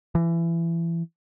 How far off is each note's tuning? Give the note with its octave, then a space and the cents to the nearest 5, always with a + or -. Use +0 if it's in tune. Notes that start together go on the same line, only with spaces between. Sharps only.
E3 +25